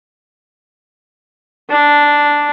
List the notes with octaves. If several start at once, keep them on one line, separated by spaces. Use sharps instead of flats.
D4